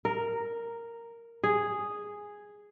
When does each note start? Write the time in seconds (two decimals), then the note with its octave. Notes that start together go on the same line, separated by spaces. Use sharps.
0.05 A#4
1.44 G#4